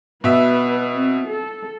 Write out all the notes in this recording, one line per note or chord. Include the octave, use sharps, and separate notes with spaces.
B2 B4 E5
C4
A4